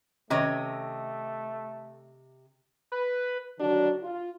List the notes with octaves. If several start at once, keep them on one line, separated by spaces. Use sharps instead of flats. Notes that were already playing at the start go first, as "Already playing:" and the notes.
C3 D#3 A3 C#4 C#5 D#5
B4
D3 D#3 F#3 D4 F#4
F4